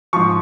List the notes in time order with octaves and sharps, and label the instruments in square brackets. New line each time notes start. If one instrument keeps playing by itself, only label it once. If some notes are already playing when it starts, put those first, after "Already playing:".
[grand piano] G#2 F3 C#6